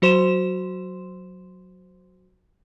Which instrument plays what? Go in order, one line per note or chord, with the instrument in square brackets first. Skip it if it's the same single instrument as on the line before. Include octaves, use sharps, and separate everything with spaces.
[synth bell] F#3 F#4 C5 C6 E7